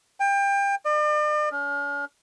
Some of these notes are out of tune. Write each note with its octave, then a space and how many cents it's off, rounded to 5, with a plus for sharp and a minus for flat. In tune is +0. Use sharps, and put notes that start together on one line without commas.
G5 +30
D5 +45
C#4 +45